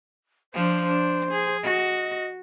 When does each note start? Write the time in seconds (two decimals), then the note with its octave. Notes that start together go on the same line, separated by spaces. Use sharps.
0.54 F3 D4 C5
0.86 D4
1.32 G#4
1.63 F#4 D#5